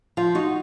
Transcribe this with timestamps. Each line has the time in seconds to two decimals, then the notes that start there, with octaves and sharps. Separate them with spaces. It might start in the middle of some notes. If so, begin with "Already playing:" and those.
0.17 F3 F4
0.35 D#4 F#4